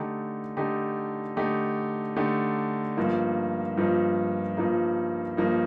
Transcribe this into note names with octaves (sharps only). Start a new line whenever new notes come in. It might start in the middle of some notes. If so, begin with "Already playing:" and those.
Already playing: D3 A3 D#4 G4
D3 A3 D#4 G4
D3 A3 D#4 G4
D3 A3 D#4 G4
G2 F3 A#3 D#4
G2 F3 A#3 D#4
G2 F3 A#3 D#4
G2 F3 A#3 D#4